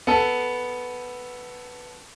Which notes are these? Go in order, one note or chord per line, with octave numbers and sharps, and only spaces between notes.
B3 A4